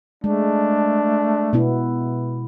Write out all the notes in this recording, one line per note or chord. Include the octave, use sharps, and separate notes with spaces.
G#3 A3 D4
B2 B3 E4